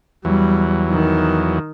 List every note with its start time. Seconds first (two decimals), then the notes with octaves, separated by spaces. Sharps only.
0.25 E2 F#3 G3
0.90 D#3